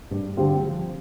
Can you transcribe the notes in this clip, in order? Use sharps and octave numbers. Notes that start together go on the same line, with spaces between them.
G2
D3 G3 C4 F4
F3